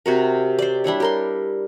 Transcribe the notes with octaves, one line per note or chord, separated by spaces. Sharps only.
C3 F#4 A#4
C5 D5
G3 D4 E4 C#5
G4 A#4 C6